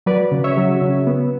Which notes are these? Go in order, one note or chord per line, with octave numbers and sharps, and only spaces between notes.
F#3 B4 D5
C#3
C#5 E5
F#3
C#3
B3